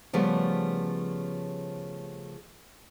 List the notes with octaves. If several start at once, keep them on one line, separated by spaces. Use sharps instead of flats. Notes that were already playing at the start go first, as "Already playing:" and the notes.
C#3 F3 G3 A3 B3